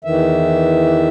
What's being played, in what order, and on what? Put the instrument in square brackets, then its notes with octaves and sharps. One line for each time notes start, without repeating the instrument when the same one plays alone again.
[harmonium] E2 D#3 E3 E5